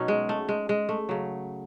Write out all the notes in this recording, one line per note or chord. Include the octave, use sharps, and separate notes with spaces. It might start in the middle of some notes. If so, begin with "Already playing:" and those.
Already playing: B2 F#3 C#4 D#4
G#3
A3
G#3
G#3
A3
C#3 F#3